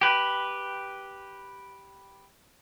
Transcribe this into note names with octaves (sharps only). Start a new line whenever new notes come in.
G4 B4